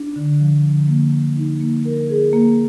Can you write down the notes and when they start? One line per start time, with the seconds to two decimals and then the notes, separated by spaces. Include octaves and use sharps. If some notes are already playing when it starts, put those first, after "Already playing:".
Already playing: D4
0.16 D3
0.40 F3
0.64 D3
0.88 A#3
1.12 A#3
1.37 D#4
1.61 A#3
1.85 A#4
2.09 G#4
2.33 A#3